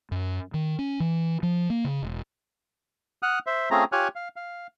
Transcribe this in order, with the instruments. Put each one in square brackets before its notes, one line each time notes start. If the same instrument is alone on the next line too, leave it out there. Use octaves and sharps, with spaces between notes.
[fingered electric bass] F#2
D#3
C#4
E3
F3
A#3
C#3
E1
[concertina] F#5 D#6 F6 F#6
C5 E5
A3 C4 C#4 F4 G#4 A#5
F4 G4 C#5 G#5 F6 F#6
F5
F5